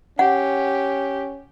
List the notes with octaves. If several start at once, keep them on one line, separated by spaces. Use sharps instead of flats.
C#4 G4 F#5